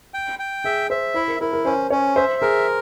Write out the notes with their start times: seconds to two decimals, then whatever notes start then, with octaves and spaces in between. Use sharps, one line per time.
0.14 G5
0.39 G5
0.64 G#4 E5
0.90 C5 E5
1.14 E4 C5
1.28 A#4
1.40 E4 A#4
1.53 A#4
1.65 C#4 C5
1.90 C#4 C#5
2.16 C5 E5
2.41 G#4 A#4